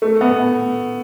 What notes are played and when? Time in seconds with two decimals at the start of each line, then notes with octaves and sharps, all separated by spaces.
0.02 A3
0.21 B3